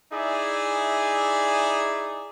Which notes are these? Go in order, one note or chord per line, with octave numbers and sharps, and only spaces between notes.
D#4 E4 G#4 D5 E5 G#5